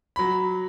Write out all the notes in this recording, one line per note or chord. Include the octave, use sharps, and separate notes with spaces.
F#3 B5